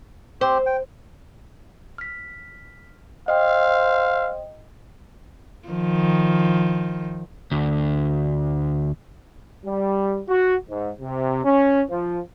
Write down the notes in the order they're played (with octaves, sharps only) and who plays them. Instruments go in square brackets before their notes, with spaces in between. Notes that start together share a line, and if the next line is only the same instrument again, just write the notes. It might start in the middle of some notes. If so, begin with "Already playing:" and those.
[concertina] C4 G4 [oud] C5
[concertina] G5
[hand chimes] F6 B6
[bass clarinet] C5 [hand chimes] D#5 G5 [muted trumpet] F5
[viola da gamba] D#3 F3
[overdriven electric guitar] D2
[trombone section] G3
F#4
G#2
C3
C#4
F3